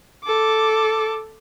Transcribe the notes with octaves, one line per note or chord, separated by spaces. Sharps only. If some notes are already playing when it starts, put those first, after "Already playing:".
A4 D6